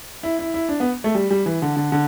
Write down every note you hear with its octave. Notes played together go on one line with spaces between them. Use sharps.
E4
E4
E4
D4
B3
A3
G3
G3
E3
D3
D3
D3